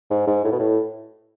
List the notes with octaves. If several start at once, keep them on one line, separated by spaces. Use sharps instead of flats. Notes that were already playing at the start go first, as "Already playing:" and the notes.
G#2
G#2
A2
B2
A2